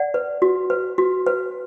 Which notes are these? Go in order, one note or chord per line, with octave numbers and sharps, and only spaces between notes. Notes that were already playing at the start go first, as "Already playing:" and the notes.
Already playing: D5 F#5
B4
F#4
B4
F#4
B4